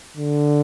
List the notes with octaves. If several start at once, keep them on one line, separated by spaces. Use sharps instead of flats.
D3